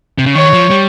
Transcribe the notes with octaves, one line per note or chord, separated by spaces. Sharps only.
C3
C#3
D#3 C#5
F3
G3